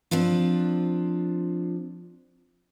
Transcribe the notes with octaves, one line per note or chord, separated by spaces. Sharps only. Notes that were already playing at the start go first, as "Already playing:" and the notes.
F3 C4 D4 F4